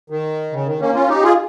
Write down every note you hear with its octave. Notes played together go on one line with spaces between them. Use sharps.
D#3
C#3
D#3
A#3 C#4
C#4 F4
D#4 G4
F4 G#4